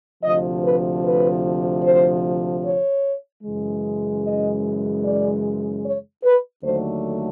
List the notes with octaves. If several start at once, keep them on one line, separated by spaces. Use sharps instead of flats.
D2 C3 F3 D#5
B4
B4
C5
C#5
F#2 C#3 E3 G#3
D#5
D5
C#5
B4
D#2 D3 F#3 A3 C5